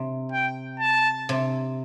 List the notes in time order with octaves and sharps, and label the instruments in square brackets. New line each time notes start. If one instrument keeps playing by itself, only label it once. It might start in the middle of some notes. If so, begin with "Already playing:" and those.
Already playing: [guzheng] C3
[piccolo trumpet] G5
A5
[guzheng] C3